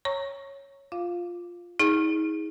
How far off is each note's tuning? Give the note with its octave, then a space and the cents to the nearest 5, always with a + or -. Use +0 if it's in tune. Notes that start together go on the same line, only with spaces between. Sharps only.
C#5 -5 A#5 -15 C#6 +0
F4 +5 F5 +0
D#4 +40 G#4 +0